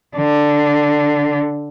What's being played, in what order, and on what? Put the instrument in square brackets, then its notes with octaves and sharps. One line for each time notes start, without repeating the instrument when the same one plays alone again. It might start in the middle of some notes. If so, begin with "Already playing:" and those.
[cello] D3